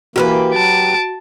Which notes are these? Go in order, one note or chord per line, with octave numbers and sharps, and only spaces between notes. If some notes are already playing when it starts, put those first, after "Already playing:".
E3 A#3 F#4 G4 A#4 B4
F#3 A5 D7